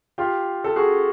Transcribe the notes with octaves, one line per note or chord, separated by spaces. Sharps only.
F4 G4
A4
F#4 G#4